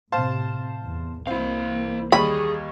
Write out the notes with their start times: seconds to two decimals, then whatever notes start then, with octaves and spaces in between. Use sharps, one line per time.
0.12 A2 C3 C5 F5 A5
0.86 E2
1.27 C2 E3 A#3 C4 E4 F5
2.12 D#2 G3 G#4 C#5 B5